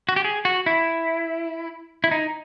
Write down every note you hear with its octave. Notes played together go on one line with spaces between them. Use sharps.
F#4
G4
G#4
F#4
E4
E4
D#4